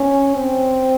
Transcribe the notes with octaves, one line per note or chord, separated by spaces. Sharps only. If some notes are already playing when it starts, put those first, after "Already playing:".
Already playing: C#4
C4